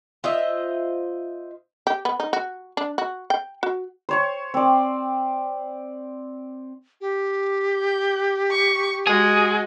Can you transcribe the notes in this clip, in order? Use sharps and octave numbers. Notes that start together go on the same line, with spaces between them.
F4 C5 D#5 E5
G4
B3
D#4
F#4
D4
F#4
G5
F#4
C5 C#5 C#6
C4 D5
G4
G6
C#6
G#3 F#4 G#4